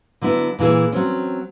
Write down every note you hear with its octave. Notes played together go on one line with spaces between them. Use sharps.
D3 F#3 B3 E4
A#2 E3 E4 G#4
F#3 C4 C#4